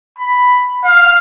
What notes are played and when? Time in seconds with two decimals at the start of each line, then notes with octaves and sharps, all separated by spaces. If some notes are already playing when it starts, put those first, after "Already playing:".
0.18 B5
0.85 F5